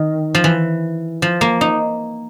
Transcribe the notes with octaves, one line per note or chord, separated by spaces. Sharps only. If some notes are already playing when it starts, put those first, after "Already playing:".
Already playing: D#3
F3
E3
F3
A#3
D#4